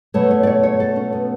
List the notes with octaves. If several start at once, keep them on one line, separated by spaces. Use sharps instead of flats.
B2 F#3 A3 C#5
C#5
D5
C#5
C#5
A4
C#4
B3